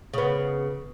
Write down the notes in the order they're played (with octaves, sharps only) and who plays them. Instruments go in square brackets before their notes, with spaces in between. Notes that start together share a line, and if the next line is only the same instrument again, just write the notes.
[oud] C#3 B3